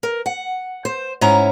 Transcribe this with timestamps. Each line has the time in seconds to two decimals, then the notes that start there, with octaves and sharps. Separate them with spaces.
0.03 A#4
0.26 F#5
0.85 C5
1.21 G#2 C#4 E4 A#5